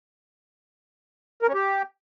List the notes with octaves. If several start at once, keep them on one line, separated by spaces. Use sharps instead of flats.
A#4
C#4
G4